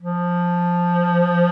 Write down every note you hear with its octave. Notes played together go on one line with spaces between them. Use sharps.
F3